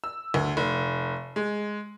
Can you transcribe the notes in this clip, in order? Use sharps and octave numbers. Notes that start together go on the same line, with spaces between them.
E6
D2
F1
G#3